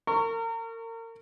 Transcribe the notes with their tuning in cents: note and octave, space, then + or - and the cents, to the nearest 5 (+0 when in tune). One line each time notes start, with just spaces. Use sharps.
A#4 -35 C#6 +0